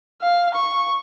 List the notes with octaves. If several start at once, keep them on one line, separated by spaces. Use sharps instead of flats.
F5
C#6